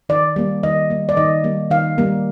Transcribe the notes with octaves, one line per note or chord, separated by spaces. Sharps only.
D#3 D5
G3 A#3
D#3 D#5
G3 A#3
D5
D#3 D#5
G3 A#3
D#3 F5
G3 A#3